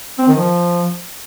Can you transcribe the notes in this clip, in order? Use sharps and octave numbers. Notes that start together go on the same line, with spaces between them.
C4
D#3
F3